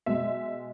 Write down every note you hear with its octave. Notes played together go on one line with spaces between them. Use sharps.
B2 G#3 E5